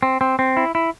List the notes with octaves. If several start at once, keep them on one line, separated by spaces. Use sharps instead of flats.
C4
C4
C4
E4
E4